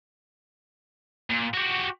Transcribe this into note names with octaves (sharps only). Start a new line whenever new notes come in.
A#2
F#4 G4